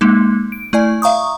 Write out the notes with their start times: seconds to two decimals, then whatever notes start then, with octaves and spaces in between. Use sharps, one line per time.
0.01 G#3 A#3 D#4
0.52 D7
0.73 A3 E4 D5 G#5
1.02 E5 F5 A#5 C#6 D#6